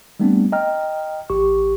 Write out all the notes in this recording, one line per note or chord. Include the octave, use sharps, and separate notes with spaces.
G3 A3 B3 C4 D4
D#5 G5 A#5 F6
A1 G4 C#6